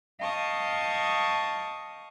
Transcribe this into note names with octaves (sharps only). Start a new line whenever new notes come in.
D#5 F5 G5 A5 C#6 D#6